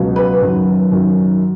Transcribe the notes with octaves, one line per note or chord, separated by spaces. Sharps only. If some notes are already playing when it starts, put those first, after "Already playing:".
Already playing: C#2 B2 F#3
B4
F#2 D#3 F#3
F#2 D#3 F#3